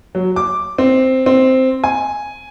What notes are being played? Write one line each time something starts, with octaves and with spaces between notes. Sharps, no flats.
F#3
D6
C4
C4
G#5